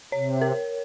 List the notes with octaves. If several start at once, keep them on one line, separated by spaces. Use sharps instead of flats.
C3 C#5
A#4